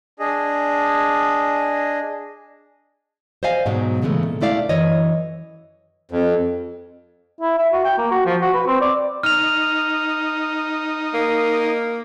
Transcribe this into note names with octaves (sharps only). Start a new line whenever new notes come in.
D4 G#4 D#5
C5 D5 D#5 F5 G#5
G#2 B2 F#3 G#3
A#2 C#3 E3 G#3 A3
A#2
G#3 A3 E4 D5 F5
F#2 E3 C#5 D#5
F2
E4
E5
F#4
G5
A#3
F#4
F3
F#4
B4
C4
D5
D#4 F6 F7
A#3